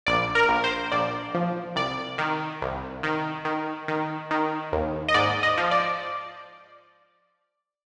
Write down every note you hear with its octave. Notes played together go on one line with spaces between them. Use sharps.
A#1 D5
A#4
A#1
C5
A#1 D5
F3
C2 D5
D#3
C2
D#3
D#3
D#3
D#3
D#2
D#5
G#2 D5
D#5
F3
D5